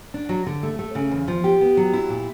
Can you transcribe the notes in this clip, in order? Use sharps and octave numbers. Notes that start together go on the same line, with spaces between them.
D4
F#3
D3
A3
A3
C#3
E2
F3
G4
B3
F#3
E4
A#2